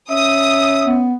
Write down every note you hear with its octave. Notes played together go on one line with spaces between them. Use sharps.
C#4 E5 D#6
B3